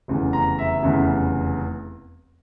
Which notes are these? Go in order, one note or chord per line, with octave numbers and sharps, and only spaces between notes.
F1 E2 C#3
A#5
E5
F1 E2 C#3